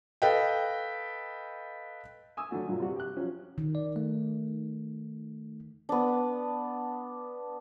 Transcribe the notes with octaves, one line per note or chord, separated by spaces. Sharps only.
A4 B4 D#5 F5 G5
G#5 D#6 E6
D3 F#3 A3 F#4
G2 A#2 F#3
C3 G3 F#4
G4 F#6
F3 F#3 C#4
D#3
D5
A3
B3 D4